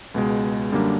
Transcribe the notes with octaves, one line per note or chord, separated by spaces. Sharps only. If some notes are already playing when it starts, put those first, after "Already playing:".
C#2 B2 G#3
F#2 D3 G3 A#3 D4